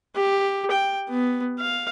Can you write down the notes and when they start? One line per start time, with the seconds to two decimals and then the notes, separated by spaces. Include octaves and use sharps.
0.15 G4
0.71 G5
1.09 B3
1.60 F5